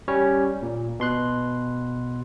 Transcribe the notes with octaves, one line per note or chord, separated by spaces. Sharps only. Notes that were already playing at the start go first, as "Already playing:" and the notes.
G3 C#4 C#5
A#2
B2 C6 F#6